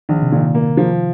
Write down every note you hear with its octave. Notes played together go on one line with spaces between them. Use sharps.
A#1 D#3
C3
A#2 D#3
A#3
F3